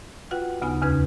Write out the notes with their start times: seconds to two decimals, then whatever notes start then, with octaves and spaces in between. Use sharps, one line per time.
0.31 F4 F#4 B4 F#5 G5
0.62 D2 C#3 B3 D#4 G#5 D#6
0.82 E2 C#3 C#4 D#4 B4 G#6